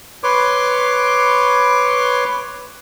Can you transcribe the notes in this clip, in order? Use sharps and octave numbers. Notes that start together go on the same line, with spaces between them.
B4 C#5 C6 D6